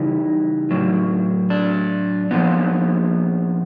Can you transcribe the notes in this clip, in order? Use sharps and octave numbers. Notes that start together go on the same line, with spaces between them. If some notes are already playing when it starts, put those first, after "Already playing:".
Already playing: C#3 E3 G3 D#4
A2 F#3
D4
A#2 F3 B3